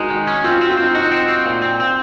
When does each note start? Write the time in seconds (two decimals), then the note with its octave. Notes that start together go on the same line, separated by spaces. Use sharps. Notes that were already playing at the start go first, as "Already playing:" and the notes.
Already playing: G#3 D#4 F#4 A#4
0.10 D#3
0.27 C#4
0.44 C4 F4
0.57 F#4
0.61 C4
0.70 F4
0.77 C4
0.82 D#4
0.95 D#4 F#4
1.12 C4
1.28 C4
1.46 A#2
1.62 C4
1.80 C4